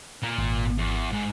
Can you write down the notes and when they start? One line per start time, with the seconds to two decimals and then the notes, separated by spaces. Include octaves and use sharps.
0.22 A#2
0.38 G#1
0.78 E2
1.13 G#2